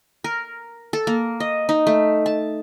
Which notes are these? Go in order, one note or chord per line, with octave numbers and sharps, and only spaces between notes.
A#4
A4
A#3
D#5
D#4
A3
A5